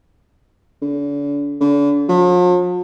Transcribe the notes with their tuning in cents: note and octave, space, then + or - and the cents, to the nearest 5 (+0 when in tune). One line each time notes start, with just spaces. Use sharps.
D3 -40
D3 -40
F3 +45